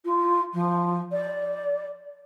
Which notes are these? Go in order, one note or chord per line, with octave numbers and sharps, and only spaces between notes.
F4
F3
D5